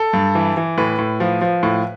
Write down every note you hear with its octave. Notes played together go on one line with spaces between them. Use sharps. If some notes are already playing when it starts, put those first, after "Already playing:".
Already playing: A4
G2
E3
E3
A2 B4
A2
F3
F3
A2